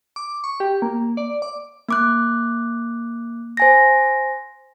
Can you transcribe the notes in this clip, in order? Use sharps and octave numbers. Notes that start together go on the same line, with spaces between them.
D6
C#6
G4
A#3
D5
D6
A#3 D6 F#6
C5 G#5 A#6